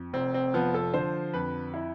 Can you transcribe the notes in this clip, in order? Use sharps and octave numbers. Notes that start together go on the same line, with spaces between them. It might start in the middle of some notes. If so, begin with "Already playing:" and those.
Already playing: F2
F1 C4
C4
F3 B3
A4
D3 C5
F2 B4
E4